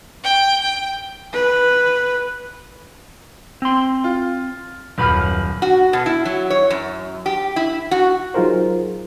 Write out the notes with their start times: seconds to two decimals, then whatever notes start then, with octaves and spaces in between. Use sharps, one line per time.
0.24 G5
0.61 G5
1.33 B4
3.62 C4 C6
4.04 F4
4.98 D#1 F#2 B4 B5 F6
5.62 F#4
5.93 B2
6.06 E4
6.25 F#3
6.50 C#5
6.70 F#2
7.26 G4
7.56 E4
7.91 F#4
8.34 F#3 D#4 F4 G#4 A#4 C5